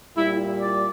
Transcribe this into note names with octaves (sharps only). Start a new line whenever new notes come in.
A#2 G3 E4
D5